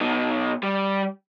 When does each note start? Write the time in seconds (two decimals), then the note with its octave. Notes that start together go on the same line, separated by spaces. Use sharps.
0.01 B2 D#4
0.63 G3